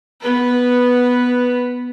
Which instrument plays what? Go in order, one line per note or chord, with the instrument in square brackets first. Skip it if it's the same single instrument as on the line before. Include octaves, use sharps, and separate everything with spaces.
[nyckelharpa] B3 B4